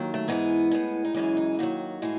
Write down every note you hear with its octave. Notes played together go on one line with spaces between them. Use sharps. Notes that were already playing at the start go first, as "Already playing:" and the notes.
Already playing: D#2 D#3 F#3
A3
G#2 E3 G#3 B3
A2 G#3
D#4
F#2 C#3 E3 G#3 C#4
D#4
D#2 D#3 F#3 F#4
A2 E3 G#3